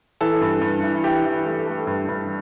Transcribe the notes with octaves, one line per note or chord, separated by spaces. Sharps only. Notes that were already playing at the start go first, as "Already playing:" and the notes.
E3 A4 A5
G2
G2
E3
E3 G4 G5
E3
A3
A3
G2
G2